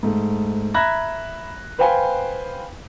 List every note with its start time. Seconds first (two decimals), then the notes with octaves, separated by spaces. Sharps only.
0.03 G#2 A3
0.74 E5 A#5 B5 F#6 G#6 A#6
1.78 B4 C5 F5 G5 G#5 B5